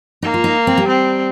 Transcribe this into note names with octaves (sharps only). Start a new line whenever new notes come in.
A#3 D#4
F4
D#4
C4
G3
C4